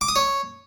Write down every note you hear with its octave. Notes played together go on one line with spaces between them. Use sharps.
D6
D#6
C#5